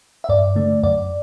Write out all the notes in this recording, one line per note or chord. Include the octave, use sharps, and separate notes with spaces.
E5
G2 D5
D3 A3
F#2 D5